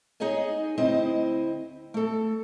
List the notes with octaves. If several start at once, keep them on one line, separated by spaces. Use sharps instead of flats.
D#4 G#4 C#5 D#5 G#5
D2 C4 E4 C5 D#5
A3 A4